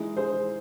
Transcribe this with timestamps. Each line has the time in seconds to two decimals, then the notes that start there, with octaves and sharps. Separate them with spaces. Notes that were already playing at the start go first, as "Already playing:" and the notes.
Already playing: E3 G#3 D#4 E4 G#4
0.17 G#4 C5